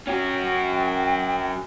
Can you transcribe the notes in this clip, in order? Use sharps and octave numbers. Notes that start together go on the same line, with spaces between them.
C#4 F#4 G5